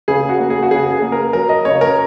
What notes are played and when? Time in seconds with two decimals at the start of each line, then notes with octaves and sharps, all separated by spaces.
0.08 C#3 G#4
0.29 F#4
0.40 A#3
0.50 G#4
0.63 F#4
0.71 C#3 G#4
0.92 G#4
1.02 A#3
1.12 A#4
1.33 F#3 A#4
1.49 D#5
1.65 C#3 C#5
1.81 A#4